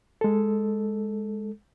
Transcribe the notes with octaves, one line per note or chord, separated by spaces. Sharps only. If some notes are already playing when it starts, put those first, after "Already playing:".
G#3 A4